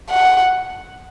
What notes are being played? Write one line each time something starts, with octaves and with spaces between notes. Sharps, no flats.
F#5